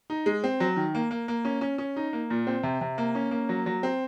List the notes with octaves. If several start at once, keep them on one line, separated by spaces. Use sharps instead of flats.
D#4
G#3
C4
F#3
D#3
A#3
A#3
A#3
C#4
C#4
C#4
D#4
A#3
A#2
C4
C3
C3
A#3
C#4
A#3
F#3
F#3
C4